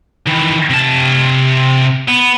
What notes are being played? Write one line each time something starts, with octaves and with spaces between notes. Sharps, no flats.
D#3 E3
C3 A5
B3